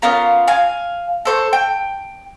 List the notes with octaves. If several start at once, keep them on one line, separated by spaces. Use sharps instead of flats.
B3 C#4 F4 A#4
F5 G#5
A4 C5 C#6
G5